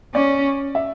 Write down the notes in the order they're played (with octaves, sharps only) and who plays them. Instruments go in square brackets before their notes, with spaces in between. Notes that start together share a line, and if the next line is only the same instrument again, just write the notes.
[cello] C#4 [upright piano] D5
[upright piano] E5